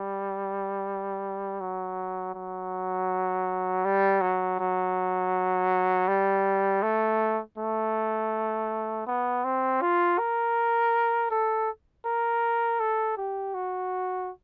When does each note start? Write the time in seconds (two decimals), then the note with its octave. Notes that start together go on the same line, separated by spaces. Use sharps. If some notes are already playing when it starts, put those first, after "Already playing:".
Already playing: G3
1.60 F#3
2.35 F#3
3.85 G3
4.21 F#3
4.59 F#3
6.08 G3
6.82 A3
7.58 A3
9.07 B3
9.44 C4
9.81 F4
10.18 A#4
11.30 A4
12.05 A#4
12.80 A4
13.16 G4
13.54 F#4